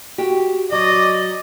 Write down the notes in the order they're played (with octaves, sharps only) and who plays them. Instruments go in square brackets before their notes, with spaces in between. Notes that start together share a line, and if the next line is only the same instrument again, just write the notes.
[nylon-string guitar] F#4 G4
[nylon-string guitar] F#3 [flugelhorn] D5 [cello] D#5